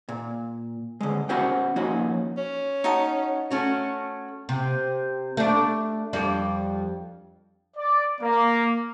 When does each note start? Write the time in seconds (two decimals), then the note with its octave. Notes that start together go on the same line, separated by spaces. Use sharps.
0.09 A#2
1.01 D3 G#3
1.29 B3 C#4 F#4 C5 F#5 G5
1.76 F3 A#3 C#4 D#4 F#4
2.37 C#4
2.84 D#4 F#4 A5
3.50 A3 C#4 F#4
4.49 C3
5.37 A3 D4
6.13 F2 G3 D4
7.76 D5
8.20 A#3